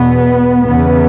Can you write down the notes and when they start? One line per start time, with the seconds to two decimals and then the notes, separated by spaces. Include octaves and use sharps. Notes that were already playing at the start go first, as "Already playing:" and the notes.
Already playing: E2 B2 B3
0.66 E2 C#3 B3